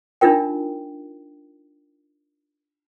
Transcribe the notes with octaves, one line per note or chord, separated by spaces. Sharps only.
D4 D#4 F4 A#4 G5